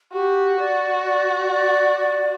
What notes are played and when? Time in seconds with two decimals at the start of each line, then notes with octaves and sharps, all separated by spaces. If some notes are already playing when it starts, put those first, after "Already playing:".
0.13 F#4 G4
0.59 D5
1.06 D5
1.52 D5
1.99 D5